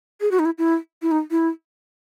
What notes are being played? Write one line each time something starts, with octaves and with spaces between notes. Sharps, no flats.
G#4
F#4
D#4
E4
E4
E4
D#4
E4